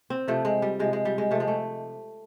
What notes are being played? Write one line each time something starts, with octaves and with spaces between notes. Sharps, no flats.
C4
C3 F3 A3
G#3
G3
C3 F3 G#3
G#3
G3
G#3
C3 F3 A3
G#3
A3